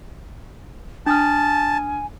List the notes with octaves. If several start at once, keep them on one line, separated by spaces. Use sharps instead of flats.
D4 G#5 A5 D#6 F6